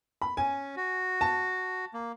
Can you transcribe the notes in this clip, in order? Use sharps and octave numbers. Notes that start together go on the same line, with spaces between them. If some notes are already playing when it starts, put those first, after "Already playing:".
B5
C#4 G#5
F#4
A5
A#3